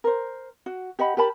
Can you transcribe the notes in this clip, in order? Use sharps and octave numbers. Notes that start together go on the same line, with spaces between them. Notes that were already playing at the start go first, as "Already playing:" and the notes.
A#4 C5
F#4
G4 D#5 F#5 B5
G4 A#4 A5 B5